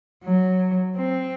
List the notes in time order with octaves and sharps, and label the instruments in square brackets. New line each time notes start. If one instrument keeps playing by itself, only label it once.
[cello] F#3
C4